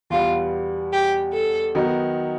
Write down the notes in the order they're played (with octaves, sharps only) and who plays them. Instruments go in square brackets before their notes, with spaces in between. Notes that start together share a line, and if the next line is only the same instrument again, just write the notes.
[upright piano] E2 B2 G3 B3 [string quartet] F4
[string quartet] G4
A4
[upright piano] D#3 F#3 B3 D#4